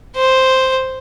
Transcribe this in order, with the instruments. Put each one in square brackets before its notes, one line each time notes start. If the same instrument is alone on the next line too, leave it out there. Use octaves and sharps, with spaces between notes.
[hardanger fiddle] C5